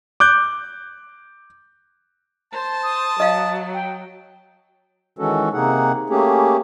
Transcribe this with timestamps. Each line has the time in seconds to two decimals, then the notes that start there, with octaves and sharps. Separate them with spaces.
0.20 D6 F#6 G6
2.53 C5 A5
2.83 D#6
3.20 F#3 D#5 F5
3.74 G5
5.19 D#3 E3 G#3 C#4 F#4 A4
5.54 C3 A#3 D#4 G#4 F#5
6.10 A3 A#3 C#4 G4 G#4